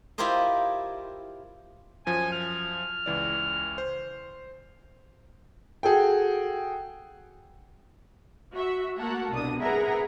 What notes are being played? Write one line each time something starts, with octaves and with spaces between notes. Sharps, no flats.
E4 F4 G4 A#4 C5 D#5
F#2 F3 G#5
F6
C#2 E3 D5
C5
F#4 G#4 A4 G5
F#4 E5
A3 A#3 F#4 A4 A#4 F#5
C2 B2 D4 D#6
G#4 A#4 B4 E5 F#5 A#5